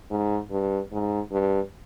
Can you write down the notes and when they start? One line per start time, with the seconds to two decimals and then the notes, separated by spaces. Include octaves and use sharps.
0.11 G#2
0.51 G2
0.92 G#2
1.32 G2